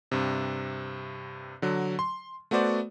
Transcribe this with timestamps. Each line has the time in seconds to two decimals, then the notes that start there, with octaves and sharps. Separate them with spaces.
0.12 G2 C3
1.62 D3 F#3
1.99 C6
2.51 A3 B3 F#4 C5 D5